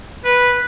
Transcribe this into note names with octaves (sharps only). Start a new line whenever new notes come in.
B4